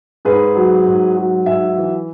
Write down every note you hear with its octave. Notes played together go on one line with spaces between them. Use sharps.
G#2 G#4 B4
F#3
G#2
F#3
G#2 E5 G#5
E3